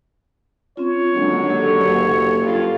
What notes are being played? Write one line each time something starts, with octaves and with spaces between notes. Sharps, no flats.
C4 C#4 F4 C#5
D3 D#3 F#3 G#3 A#3 D4
G4 A4
F#1
G2 F4